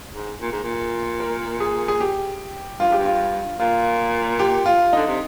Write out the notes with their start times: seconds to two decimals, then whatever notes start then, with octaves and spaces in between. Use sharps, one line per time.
0.14 G#2
0.41 A#2
0.52 G#2
0.64 A#2
1.20 A#4
1.60 G#4
1.88 G#4
2.00 G4
2.80 G2 F4
2.89 G#2 G4
2.98 G2
3.05 F4
3.59 A#2 F4
4.39 G4
4.66 F4
4.93 D3 D#4
5.08 C3